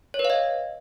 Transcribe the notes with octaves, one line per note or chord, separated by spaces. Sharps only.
C#5
B4
F5
D#5